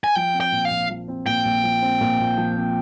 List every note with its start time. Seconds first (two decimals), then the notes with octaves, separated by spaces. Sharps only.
0.04 G#5
0.15 F3 G5
0.34 C4
0.40 G5
0.52 A#2
0.65 F5
0.71 A#1
0.90 F3
1.08 C4
1.26 A#2 G5
1.45 A#1
1.64 F3
1.82 C4
2.01 A#2
2.19 A#1
2.38 F3
2.56 C4